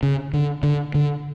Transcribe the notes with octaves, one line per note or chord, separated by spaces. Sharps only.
C#3
D3
D3
D3